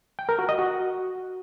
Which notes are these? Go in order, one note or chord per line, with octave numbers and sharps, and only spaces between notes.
G5
A#4
F#4
D#5
F#4